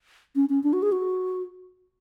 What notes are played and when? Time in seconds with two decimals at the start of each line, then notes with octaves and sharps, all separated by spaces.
0.36 C#4
0.49 C#4
0.64 D4
0.73 F#4
0.82 G#4
0.92 F#4